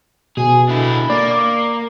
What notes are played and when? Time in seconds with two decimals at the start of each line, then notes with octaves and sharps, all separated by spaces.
0.37 B2 G#4
0.69 D3 E4
1.10 A#3 D5
1.31 D6